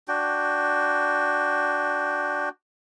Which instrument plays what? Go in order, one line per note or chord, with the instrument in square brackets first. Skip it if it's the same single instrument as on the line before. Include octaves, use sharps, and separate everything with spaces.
[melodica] D4 F#4 G5